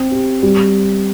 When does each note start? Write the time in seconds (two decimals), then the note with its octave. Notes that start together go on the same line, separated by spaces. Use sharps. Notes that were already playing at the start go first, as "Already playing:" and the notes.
Already playing: C4
0.12 G4
0.43 G3